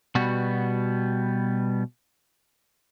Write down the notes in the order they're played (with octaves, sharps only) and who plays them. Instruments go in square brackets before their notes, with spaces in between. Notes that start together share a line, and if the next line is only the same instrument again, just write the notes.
[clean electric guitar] B2 G3 B3 F#4